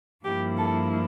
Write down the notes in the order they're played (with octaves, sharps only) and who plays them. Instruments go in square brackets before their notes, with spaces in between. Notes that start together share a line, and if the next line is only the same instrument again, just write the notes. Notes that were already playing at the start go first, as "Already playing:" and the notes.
[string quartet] G2 F3 A#3 E4 G4
A4